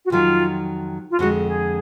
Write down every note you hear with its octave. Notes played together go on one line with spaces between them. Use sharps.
F#4
F2 D#3 F#3 F4
F4
F2 D3 G#3 F#4
G#4